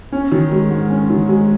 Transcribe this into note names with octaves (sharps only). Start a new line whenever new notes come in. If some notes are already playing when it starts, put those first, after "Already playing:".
C#4
D#3
G#3
G#2
C#4
D#3
G#3